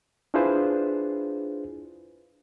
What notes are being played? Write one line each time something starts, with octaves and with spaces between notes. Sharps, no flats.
D4 E4 F4 G#4 B4 C5